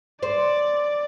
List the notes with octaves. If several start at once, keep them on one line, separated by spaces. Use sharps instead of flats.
C5 D5